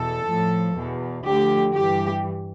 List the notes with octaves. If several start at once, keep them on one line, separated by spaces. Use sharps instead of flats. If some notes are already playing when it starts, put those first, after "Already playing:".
Already playing: E2 B2 A4
A2 F3
E2 B2
D2 D3 F3 G4
G2 E3 G4